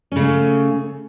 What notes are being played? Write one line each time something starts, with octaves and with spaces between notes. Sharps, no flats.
C#3 A3 C#4